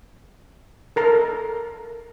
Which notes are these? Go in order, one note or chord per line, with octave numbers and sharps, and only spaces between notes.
A4 A#4 A#5